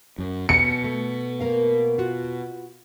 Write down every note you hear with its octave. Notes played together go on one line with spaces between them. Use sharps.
F#2
B2 C#7
A3
A#3 A#4 F5
F4 F#4